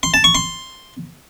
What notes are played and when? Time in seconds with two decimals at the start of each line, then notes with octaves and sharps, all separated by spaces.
0.03 C6
0.14 A5
0.24 C#6
0.35 C6